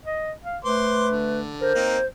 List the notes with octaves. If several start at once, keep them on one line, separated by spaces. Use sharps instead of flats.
D#5
F5
A3 B4 C5 C6 D6
D3
A#4 C5
A#3 C4 D#4